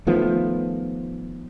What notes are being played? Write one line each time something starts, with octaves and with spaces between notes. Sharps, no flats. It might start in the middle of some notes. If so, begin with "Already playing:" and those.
D#3 F3 A3 B3